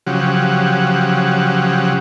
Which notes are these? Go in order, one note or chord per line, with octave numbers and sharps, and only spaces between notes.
C#3 F3 F#3 G4 F#5